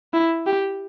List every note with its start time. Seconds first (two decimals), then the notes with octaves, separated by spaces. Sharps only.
0.13 E4
0.47 G4